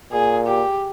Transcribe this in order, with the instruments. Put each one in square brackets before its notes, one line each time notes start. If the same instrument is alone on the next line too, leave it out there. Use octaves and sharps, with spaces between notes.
[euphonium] A#2 [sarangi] G#4
[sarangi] G4